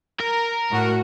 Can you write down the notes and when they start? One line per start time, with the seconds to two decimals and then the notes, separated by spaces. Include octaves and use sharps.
0.20 A#4
0.70 A2 F#4